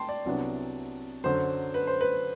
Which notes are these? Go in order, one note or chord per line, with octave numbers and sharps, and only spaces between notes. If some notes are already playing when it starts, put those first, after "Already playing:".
Already playing: G5 A5 C6
D5
C2 C3 F#3 B3 D4
F#2 D3 F#3 C5
B4
C5
B4